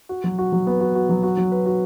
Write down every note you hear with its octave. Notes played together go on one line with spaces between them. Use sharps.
F#4
F#3
F#4
F#3
B3
F#4
F#4
F#3
F#4
F#3
B4
F#4